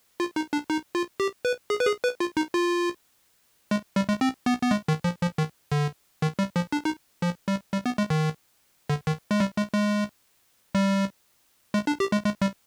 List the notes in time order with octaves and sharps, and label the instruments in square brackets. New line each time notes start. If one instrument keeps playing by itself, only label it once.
[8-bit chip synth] F4
D#4
D4
D#4
F4
G4
B4
G#4
B4
G#4
B4
F4
D#4
F4
G#3
G3
G#3
C4
B3
B3
G#3
D#3
F3
F3
D#3
D3
D#3
G3
F3
D4
D#4
F3
G3
G3
B3
G#3
D#3
D3
D#3
G#3
G3
G#3
G#3
G3
G#3
D4
G4
G#3
G#3
G3